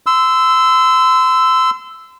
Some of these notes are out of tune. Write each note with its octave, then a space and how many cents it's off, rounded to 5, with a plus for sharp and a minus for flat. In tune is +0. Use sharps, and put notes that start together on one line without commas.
C6 -30 E6 +0